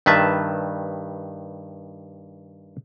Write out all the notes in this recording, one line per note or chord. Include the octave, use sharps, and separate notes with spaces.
G2 D#3 B4 E5 A5